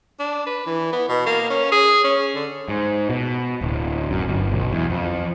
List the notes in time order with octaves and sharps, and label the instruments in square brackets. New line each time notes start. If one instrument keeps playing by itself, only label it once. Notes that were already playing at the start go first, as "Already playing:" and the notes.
[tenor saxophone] D4
B4
E3
B3
B2
A#3
C#4
G#4
C#4
D3
[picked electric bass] G#2
B2
D1
F#2
G1
B1
E2
F2